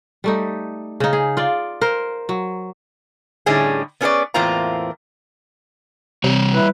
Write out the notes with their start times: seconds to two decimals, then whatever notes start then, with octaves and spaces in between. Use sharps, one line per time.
0.24 G3 A3 D#4
1.00 C#3 D#4
1.13 G#4
1.37 F4 D5
1.81 A#4 C5
2.29 F#3
3.46 A2 D3 G3 C#4 D#4 G#4
4.01 B3 C#4 G#4 A4 B4 D5
4.34 E2 A2 A#3 C4 F4 A#5
6.24 C3 G3 C#5
6.54 E4 B4